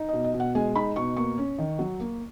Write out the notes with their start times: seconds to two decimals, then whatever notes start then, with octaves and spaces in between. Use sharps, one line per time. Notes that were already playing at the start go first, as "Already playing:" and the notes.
Already playing: D#4
0.09 B2 D#5
0.24 D#5
0.34 B2
0.40 F#5
0.55 G#3 G#5
0.76 D#4 B5
0.96 B2 C#6
1.17 A#3 C#6
1.38 C#4
1.58 D#3
1.79 F#3
2.00 A#3